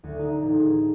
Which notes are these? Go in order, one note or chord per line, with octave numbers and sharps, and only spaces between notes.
D2
D#4
A1
G#4